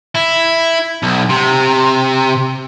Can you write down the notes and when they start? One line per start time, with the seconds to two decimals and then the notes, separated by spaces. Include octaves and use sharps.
0.15 E4
1.02 B1
1.30 C3